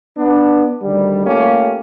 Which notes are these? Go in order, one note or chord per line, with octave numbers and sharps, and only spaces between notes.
B3 D4
D2 D#3 G3
A3 A#3 C#4 F4 G4